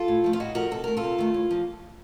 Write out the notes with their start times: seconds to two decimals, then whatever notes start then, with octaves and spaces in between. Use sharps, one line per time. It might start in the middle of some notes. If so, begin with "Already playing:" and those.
Already playing: F4 A4
0.08 A2
0.24 F3 A3
0.33 F4
0.39 A2 D#4 F#4
0.55 F3 A3 F#4 A#4
0.71 C3 A4
0.84 D#3 A3 A#4
0.97 F4 A4
1.03 C3
1.18 D#3 A3
1.34 A2
1.51 F3 A#3